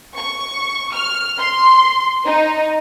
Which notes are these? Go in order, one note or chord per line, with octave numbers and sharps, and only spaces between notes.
C#6
F6
C6
D#4